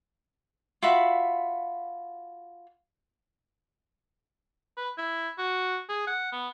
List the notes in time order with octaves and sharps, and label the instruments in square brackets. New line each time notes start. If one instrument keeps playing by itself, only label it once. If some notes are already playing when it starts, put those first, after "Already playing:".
[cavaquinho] F4 F#4 E5 B5
[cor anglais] B4
E4
F#4
G#4
F#5
B3